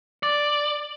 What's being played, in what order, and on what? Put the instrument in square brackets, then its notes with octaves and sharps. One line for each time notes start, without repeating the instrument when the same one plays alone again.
[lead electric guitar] D5